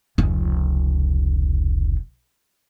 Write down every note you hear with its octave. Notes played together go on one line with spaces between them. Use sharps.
F1 C#2